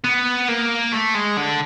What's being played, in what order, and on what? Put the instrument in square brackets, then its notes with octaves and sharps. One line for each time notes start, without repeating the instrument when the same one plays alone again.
[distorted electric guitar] B3
A#3
A3
G#3
D3